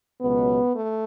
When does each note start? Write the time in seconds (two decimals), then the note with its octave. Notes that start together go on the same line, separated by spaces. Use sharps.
0.22 C#2 B2 F#3 B3
0.74 A3